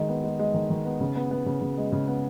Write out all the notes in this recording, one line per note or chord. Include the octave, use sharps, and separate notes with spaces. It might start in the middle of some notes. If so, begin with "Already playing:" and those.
Already playing: D#3 G#3
B3
G#3
G#3
D#3
D#3
B3
C#3
B3
B3
C#3
C#3
G#3
C#3
B3